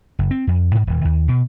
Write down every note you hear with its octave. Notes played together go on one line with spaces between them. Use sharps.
F#1
C4
F2
G#2
D#1
D#2
B2